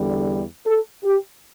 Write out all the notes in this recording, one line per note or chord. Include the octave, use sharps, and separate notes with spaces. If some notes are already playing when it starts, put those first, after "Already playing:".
Already playing: E2 D3 G3
A4
G4